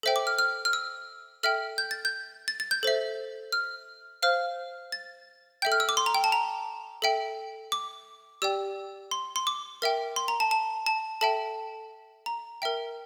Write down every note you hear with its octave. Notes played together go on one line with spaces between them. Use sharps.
A4 C5 E5 G5
D6
F6
F6
F6
E6
A4 E5 G5 F6
G6
A6
G6
A6
A6
G6
A4 C5 E5
F6
C5 F5 F6
A6
A4 E5 G5 G6
F6
E6
D6
C6
A#5
G5
A5
A#5
A4 E5 G5
D6
G4 D5 G5 E6
C6
C6
D6
A#4 E5 G5
C6
A#5
A5
A5
A5
A4 E5 G5 A5
A#5
A#4 E5 G5